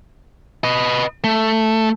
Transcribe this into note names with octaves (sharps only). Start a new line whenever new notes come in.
B4 D#5
A3